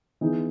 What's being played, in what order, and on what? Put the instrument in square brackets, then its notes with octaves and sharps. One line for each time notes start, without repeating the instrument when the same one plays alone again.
[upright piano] E3 B3 D#4 G#4